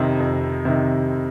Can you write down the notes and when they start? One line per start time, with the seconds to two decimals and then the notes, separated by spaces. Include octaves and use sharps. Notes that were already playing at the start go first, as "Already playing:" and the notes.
Already playing: F2 C3 D#3
0.20 F2
0.65 C3 D#3